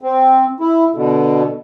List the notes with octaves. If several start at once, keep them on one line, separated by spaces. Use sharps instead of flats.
C4
E4
B2 D3